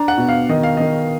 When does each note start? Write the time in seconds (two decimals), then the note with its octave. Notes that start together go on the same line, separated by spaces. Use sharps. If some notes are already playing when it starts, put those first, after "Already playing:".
Already playing: D4 A#5
0.08 F#5
0.18 B2
0.29 F5
0.49 D#3 D#5
0.63 F5
0.77 D#3 D#5